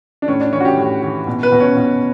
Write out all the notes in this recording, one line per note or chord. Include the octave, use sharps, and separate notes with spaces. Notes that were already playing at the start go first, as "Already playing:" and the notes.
D4
A2 C#4
D4
E3 C#4
F#4
G4
A2
E3
B2
B4
B2
C#4
B2